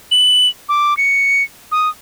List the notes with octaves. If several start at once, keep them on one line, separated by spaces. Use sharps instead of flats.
F#7
D6
C#7
D#6